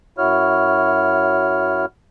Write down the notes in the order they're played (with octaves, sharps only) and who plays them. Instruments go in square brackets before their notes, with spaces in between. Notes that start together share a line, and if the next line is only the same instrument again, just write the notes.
[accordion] F#2 E4 F#4 C#5 F6